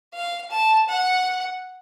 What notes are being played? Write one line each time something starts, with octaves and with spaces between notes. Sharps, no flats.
F5
A5
F#5